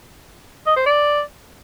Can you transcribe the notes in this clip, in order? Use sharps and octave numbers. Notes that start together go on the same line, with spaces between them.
D#5
C5
D5